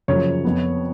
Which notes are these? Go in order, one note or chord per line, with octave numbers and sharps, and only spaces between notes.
F#2 C#3 F3 C#5
F2 F3 B3